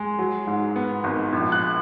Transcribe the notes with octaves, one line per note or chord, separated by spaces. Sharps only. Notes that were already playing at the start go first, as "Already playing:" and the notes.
Already playing: G#3
F#3
G#2
B3
G#1
A#1
F#6